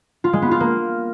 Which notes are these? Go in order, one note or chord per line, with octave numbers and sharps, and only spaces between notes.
F4
G#3
B3
F4
A#3